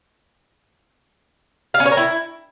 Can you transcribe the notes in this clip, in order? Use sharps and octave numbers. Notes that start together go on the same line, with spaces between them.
F5
C#4
C#5
A#4
E4